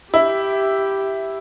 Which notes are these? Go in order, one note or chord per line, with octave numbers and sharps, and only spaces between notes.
E4 G4